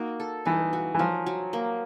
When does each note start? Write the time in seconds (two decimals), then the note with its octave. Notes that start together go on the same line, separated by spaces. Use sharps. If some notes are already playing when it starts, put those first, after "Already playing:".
Already playing: A#3 D#4 F#4
0.20 A4
0.45 E3 D#4
0.73 F#4
0.95 E3
0.99 F3 F#3
1.26 F#3
1.53 A#3